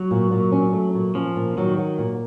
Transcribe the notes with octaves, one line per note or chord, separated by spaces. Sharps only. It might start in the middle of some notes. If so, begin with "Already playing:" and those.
Already playing: F#3
A#2
A#2
C#4
A3
A#2
F3 C#4
A#2
D#3 F#3
F#3
A#2